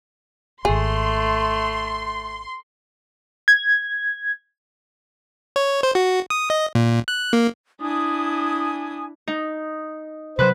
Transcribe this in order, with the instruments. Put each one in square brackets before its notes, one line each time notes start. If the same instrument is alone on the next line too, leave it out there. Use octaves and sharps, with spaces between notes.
[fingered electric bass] D1 G#1 [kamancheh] A3 [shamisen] G#4 [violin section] C6
[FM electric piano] G#6
[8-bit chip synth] C#5
C5
F#4
D#6
D#5
A#2
F#6
A#3
[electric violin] D4 E4 [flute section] G#5 D#6
[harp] D#4
[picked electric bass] C3 F#3 [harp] B4 F#6 [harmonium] C5